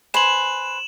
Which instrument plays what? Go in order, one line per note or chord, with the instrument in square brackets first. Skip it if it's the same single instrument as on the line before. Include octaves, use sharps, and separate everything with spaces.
[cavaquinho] B4 C5 G#5 [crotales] E7 F#7